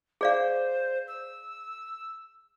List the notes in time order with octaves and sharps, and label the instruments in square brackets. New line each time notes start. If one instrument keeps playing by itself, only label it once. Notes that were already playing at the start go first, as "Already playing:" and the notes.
[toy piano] G#4 D5 F5 [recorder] C5
[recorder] E6